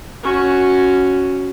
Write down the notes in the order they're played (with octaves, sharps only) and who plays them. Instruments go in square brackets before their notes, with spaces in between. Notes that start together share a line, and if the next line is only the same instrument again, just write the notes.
[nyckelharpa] C#4 F#4